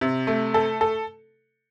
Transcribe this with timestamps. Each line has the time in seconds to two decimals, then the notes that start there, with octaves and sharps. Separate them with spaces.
0.01 C3
0.27 A3
0.54 A4
0.81 A4